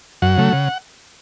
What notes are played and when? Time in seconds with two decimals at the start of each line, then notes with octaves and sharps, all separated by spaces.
0.22 F#2 F#5
0.37 C#3 F#3 A3
0.53 C#3